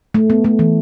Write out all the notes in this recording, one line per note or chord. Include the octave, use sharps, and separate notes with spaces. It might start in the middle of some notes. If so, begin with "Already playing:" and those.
A3
B3
A3
E3